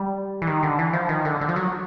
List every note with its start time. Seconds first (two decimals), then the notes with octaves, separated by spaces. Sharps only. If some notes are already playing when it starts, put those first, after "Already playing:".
Already playing: G3
0.42 E3
0.47 D#3
0.63 D3
0.79 E3
0.93 F3
1.09 D#3
1.25 D3
1.41 D3
1.49 F3
1.56 F#3